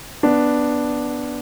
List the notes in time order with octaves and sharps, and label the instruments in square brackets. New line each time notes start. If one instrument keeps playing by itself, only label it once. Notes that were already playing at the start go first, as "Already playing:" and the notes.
[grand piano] B3 D4